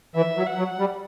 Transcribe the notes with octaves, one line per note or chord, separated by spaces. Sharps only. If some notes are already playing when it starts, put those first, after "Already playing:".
E3 E5
F#3
F#5
F#3
G3